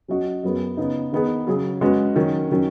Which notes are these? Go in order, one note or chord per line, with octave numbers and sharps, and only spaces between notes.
F#3 C#4 F#4 D#5
F#2 F#3 B3 G#4
C#3 B3 D#4
D#3 B3 D#4 G#4 B4
C#3 F#3 C#4 G#4
G#3 C#4 F#4 B4
D#3 F#3 C#4
D#3 F#3 C#4